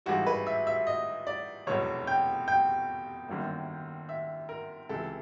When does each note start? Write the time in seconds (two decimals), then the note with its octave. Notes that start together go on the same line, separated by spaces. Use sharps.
0.06 G#1 G#2 E3 G3 F#4
0.27 B4
0.47 E5
0.67 E5
0.87 D#5
1.27 D5
1.67 F1 E2 B2 F#3 C#5
2.07 G5
2.48 G5
3.28 G1 F#2 D#3 F#3 A#3
4.09 E5
4.49 A#4
4.89 C#2 C3 E3 A4